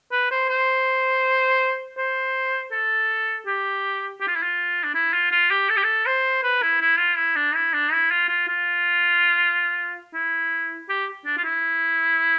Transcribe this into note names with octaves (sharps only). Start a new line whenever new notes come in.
B4
C5
C5
C5
A4
G4
G4
F4
E4
F4
D4
E4
F4
F4
G4
A4
G4
A4
C5
B4
E4
E4
F4
E4
D4
E4
D4
E4
F4
F4
F4
E4
G4
D4
F4
E4